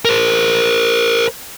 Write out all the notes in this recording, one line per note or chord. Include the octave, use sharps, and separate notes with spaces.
A#4 C5